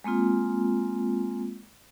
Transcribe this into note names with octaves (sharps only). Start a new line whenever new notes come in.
G#3 A#3 C4 F4